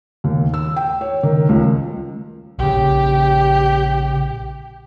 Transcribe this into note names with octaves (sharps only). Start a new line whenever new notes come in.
D#2
E6
G5
C#5
D#3
C#2
A#1 C#3 G4